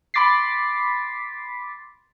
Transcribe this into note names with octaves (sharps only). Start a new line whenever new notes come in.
B5 C6 D6 A6 B6 C7